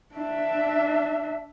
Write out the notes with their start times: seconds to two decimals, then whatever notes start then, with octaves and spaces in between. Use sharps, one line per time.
0.15 D4 E5